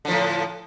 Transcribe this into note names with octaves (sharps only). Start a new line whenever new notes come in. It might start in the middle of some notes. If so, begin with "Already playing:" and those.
A2 D3 F3